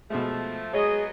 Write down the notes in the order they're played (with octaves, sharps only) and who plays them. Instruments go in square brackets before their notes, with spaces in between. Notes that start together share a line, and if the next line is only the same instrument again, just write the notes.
[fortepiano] B2 G#3 [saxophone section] F3 A3
[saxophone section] F#3 B3 D#5 [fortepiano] G#3 C#5 [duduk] G#4